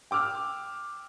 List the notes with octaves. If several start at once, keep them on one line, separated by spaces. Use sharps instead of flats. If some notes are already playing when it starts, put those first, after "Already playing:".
G5 D6 E6 F6